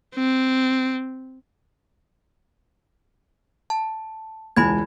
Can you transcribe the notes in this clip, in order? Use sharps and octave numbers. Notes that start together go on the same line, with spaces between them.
C4
A5
E1 C#2 E4 G#5 B5 G#6